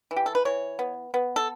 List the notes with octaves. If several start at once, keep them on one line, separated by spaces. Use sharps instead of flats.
E3
G4
A4
B4
E3 C#5
B3
B3
A4